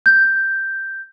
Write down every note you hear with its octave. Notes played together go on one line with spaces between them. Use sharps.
G6